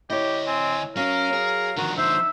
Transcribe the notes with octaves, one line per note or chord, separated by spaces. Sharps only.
D2 E4 G4 C#5 D#5
C4 G#5
F#3 C#4 A#4 F5
G#4
D3 D#3 F3 F#4 A#5
D#4 C5 E5